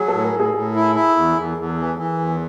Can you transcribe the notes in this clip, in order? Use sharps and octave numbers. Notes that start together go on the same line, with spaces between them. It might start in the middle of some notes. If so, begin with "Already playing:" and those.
Already playing: F#3 G#4
A2 A4
A#4
A2
G#4
A2 G#4
E4
E4
E2
E2
E2
E3
E3
E2